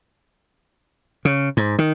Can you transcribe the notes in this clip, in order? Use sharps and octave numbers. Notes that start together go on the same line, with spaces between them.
C#3
G#2
D#3